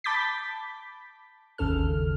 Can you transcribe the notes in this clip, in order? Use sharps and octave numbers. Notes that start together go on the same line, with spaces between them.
A5 B5 D6 G6 A6 B6
G#1 D#2 C#3 A4 F6